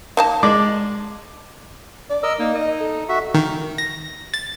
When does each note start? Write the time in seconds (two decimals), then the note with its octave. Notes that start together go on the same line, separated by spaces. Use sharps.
0.17 D#3 A#3 A5
0.43 G#3 D5 D6
2.10 D5
2.23 A#4 D#5 E6
2.39 A#3 D#4
2.55 D#5
2.80 A4
3.09 F#4 E5
3.34 D#3
3.78 A#6
4.34 A6